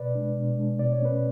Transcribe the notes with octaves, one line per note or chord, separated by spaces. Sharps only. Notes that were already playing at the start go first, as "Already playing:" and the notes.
Already playing: B2 B4 D5
G#3 D4
B2
G#3 D4
B2 D5
C#5
A3 C#4 B4